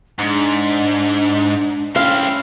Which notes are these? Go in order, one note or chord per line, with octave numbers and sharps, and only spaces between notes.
G#2 D4
C4 C#4 E4 F5